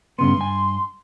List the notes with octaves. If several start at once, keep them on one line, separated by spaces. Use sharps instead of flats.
G2 C#3 B3 C6
G2 G#5